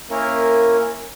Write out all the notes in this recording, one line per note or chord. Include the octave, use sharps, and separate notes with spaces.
A#3 C#4 E4 A#4